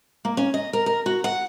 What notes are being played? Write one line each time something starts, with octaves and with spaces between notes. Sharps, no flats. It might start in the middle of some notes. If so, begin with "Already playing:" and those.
A#3
C#4
D#5
A#4
A#4
F#4
F#5